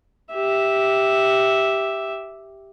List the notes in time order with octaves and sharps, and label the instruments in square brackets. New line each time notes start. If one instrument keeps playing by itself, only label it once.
[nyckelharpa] G4 E5